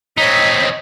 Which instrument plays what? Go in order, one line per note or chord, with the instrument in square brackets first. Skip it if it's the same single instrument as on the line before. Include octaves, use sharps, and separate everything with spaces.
[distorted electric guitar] C4 D#4 [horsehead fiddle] C#5 D#5 [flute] B6